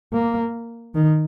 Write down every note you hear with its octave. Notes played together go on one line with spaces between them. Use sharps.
A#3
D#3